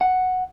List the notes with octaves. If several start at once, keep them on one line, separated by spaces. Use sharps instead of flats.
F#5